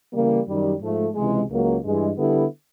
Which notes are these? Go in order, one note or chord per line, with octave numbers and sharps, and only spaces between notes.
C#3 E3 G3 A#3
F#2 D#3 G3
G#2 F3 A3
C#2 C3 E3 G#3
C#2 C#3 F#3 A#3
G2 E3 G#3
D3 G3 B3 E4 A4